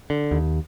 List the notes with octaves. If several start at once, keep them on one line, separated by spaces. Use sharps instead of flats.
D3
D#2